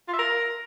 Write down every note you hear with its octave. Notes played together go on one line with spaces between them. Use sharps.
F4
E5
A#4